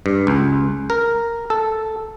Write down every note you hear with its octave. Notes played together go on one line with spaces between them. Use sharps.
G2
C#2
A#4
A4